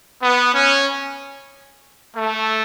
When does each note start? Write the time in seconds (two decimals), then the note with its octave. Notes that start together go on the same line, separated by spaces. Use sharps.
0.23 B3
0.55 C#4
2.17 A3